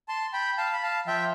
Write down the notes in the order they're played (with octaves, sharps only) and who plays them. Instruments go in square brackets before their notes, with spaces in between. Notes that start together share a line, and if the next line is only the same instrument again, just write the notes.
[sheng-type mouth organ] A5 C6
G5 B5
F5 A5
B5
F5 A5
[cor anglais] F3 [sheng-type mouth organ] E5 G5